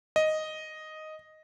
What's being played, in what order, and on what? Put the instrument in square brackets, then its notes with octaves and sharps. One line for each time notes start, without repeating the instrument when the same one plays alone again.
[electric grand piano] D#5